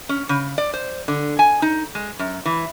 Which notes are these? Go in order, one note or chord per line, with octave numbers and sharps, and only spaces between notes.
C#4
C#3
D5
C5
D3
G#5
D#4
G#3
F#2
E3